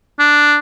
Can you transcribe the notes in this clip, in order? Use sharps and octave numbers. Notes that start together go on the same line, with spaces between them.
D4